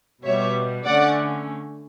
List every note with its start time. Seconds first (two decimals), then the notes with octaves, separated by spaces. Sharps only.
0.23 B2 G3 B3 C#5 E5
0.85 D3 A3 C#4 D5 F#5